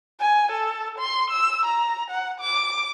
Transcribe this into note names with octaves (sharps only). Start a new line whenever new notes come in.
G#5
A4
C6
E6
A#5
F#5
D6